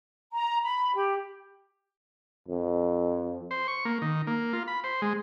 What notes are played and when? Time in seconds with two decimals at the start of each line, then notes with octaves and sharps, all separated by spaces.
0.33 A#5
0.63 B5
0.95 G4
2.48 F2
3.51 C5
3.68 C#6
3.85 A#3
4.02 D#3
4.27 A#3
4.53 F4
4.68 B5
4.84 C5
5.02 G#3